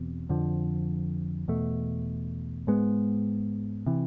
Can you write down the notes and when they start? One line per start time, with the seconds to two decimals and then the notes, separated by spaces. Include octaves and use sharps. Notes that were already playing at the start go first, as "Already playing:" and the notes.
Already playing: E2 B2 C4
0.29 F2 D3 F3
1.48 E2 B2 A3
2.67 G#2 G#3 B3
3.86 C3 E3